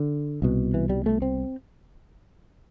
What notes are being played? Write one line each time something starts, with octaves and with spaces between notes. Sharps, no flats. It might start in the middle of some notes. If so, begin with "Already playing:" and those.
Already playing: D3
C2 B2
E3
G3
A3
C4